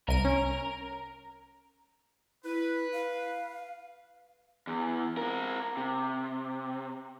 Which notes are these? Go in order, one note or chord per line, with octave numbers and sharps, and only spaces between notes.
C2 A#4 D#7
C#4
E4 B4
F5
E2
C4 A#4
C3